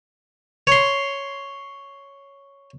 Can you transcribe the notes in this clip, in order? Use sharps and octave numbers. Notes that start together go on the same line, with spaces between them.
C#5 C6